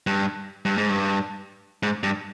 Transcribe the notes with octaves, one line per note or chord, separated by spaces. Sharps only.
G2
G2
G#2
G2
G#2
G2